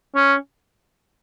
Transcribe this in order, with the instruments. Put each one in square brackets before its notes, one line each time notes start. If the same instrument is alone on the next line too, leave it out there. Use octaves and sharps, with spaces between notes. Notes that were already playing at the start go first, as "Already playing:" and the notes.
[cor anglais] C#4